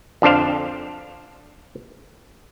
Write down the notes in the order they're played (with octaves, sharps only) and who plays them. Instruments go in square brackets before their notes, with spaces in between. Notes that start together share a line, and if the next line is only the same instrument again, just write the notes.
[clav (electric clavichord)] F2 D3 D4 C5 F5